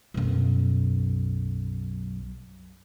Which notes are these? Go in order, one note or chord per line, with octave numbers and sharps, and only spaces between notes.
B1 F#2